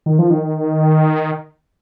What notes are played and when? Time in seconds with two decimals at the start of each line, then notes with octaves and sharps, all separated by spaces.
0.06 D#3
0.19 F3
0.30 D#3